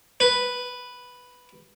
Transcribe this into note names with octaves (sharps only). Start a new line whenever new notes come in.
B4